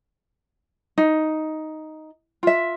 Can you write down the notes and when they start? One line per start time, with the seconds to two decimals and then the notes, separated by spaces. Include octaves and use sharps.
0.98 D#4
2.43 F4 E5